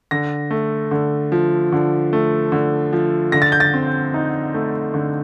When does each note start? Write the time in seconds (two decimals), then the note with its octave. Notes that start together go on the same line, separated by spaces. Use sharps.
0.11 D3 A#6
0.51 A3
0.91 D3
1.32 F3
1.72 D3
2.13 A3
2.52 D3
2.93 F3
3.32 D3 A#6
3.42 A6
3.52 G6
3.60 A6
3.73 C4
4.14 D#4
4.54 A3
4.94 D3